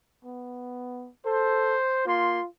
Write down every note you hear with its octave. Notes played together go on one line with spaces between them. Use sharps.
B3
A4 C5
A#3 F4 C6